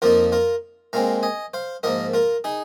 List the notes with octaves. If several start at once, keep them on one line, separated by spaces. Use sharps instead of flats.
F2 F3 A#3 D#4 F4 A#4
F4 A#4
A#2 G#3 C4 F5 A#5
D#5 G#5
C5 F5
G#2 F3 A#3 A#4 D#5
F4 A#4
D#4 G#4